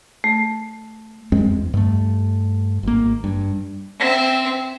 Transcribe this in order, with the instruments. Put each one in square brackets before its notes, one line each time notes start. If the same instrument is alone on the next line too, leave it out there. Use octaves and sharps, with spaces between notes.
[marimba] A3
[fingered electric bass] F#2 G#3 C4
E2
G2 A3
G#1 A#3
G2
[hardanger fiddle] C4 E5